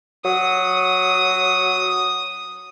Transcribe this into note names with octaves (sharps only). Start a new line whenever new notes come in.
F#3 D#6